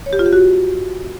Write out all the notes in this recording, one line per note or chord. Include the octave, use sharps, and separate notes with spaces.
C#5
G4
F4
G4
F#4